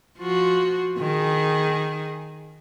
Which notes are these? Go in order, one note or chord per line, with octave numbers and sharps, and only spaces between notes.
F3 F4 F#4
D#3 G#4